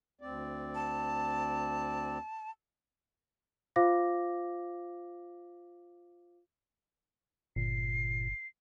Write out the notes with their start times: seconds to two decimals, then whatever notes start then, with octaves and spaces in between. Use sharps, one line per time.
0.21 D2 C4 D5
0.75 A5
3.76 F4 C5 F5 D6 A#6
7.56 G1 A#2 C7